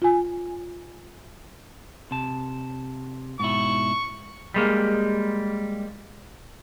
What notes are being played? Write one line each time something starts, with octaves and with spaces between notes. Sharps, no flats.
F4 G#5
C3 A5
G#2 B2 E4 C#6
G3 G#3 A#3